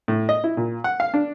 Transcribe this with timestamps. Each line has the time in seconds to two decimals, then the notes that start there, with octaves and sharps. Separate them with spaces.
0.08 A2
0.29 D#5
0.44 E4
0.57 A#2
0.84 F#5
1.00 F5
1.14 D4